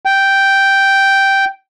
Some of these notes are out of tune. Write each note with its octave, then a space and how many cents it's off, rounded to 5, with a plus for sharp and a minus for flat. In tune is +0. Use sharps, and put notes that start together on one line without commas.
G5 -5